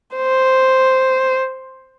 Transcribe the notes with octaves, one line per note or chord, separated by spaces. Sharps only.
C5